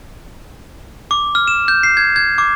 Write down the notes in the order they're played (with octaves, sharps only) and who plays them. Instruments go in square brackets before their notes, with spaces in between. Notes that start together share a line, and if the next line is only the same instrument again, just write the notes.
[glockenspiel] D6
F6
E7
G6
C7
G#6
G#6
D6